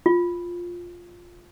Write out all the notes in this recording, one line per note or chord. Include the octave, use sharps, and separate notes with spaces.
F4